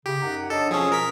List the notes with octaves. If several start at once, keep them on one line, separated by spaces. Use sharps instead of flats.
C#3 G4
F#2 D#4 F#5
D4 A4 C#5 D#5
F2 B2 F3 C#4 G#4
A#4 B6